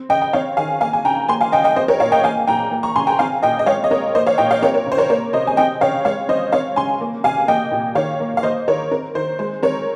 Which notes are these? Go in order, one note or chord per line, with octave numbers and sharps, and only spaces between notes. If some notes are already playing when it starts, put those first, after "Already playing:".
Already playing: C4
C#3 D#5 G5
G5
C4 C#5 F5
D#3 F5 G#5
A#3 F5 G#5
G#5
C#3 G5 A#5
A#3 G#5 C6
F5 G#5
C#3 D#5 G5
D#5 G5
C4 C5 D#5
A#4 C#5
A#2 C#5 F5
D#5 G5
A#3 F5 G#5
A#2 G5 A#5
A#3
A#5 C#6
C#3 G#5 C6
G5 A#5
C4 F5 G#5
A#2 D#5 G5
D#5
G#3 C#5 F5
D#5
C4 A#4 C#5
A#3 C5 D#5
C#5 F5
A#2 D#5 G5
C#5 F5
C4 A#4 C#5
A#4 C#5
C#3
C5
A#4 C#5
A#3 A#4 C#5
C3 C5 D#5
G#5
C4 D#5 G5
C#3 C#5 F5
G#3 C#5 F5
C4 C5 D#5
C4 C#5 F5
C#3 G#5 C6
A#3
C3 F5 G#5
A#3 D#5 G5
A#2
D#3 C#5 F5
A#3
F5
A#3 C5 D#5
D#3 A#4 C#5
C4 A#4
D#3 C5
G#3 C5
C4 A#4 C#5